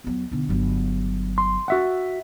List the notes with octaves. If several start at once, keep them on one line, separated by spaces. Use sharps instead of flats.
E2 F#3
B1 D3
G1 F#3
C6
F#4 E5 F#5